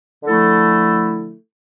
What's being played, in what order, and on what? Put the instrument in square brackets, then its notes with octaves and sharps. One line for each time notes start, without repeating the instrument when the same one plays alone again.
[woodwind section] D3 F3 A3 E4 A4